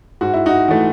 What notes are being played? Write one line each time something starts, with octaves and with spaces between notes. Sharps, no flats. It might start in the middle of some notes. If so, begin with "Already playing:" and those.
G#2 F#4
E4
D#4 F#4
E3 A3